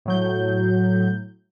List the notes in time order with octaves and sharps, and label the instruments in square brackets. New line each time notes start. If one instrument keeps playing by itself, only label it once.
[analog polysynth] A2 F#3 G6